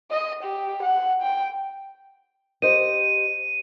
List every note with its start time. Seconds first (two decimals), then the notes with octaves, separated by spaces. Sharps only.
0.11 D#5
0.43 G4
0.83 F#5
1.22 G5
2.62 G4 C5 D#5 D#7